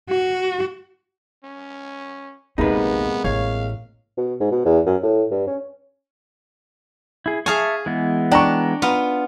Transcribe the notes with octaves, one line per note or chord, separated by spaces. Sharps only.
F#4
C#4
A#1 D#2 C3 G#3 A#3 B3 D#4 B4
A1 C#5 F5
B2
G#2
B2
E2
F#2
A2
G2
C#4
E4 G#4
G#4 E5 F5 G#5 A5 C#6
E3 G#3 B3
D4 G5 A#5 C#6
B3 F4